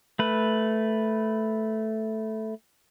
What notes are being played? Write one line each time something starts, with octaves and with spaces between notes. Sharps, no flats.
A3 B4